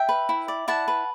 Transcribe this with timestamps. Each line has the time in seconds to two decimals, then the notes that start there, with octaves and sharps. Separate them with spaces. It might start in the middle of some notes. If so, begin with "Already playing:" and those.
Already playing: E5 G5
0.09 B4
0.29 E4
0.48 D5
0.68 E4 F#5 A5
0.88 B4